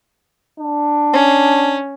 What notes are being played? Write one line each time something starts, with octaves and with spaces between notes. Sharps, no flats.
D4
C#4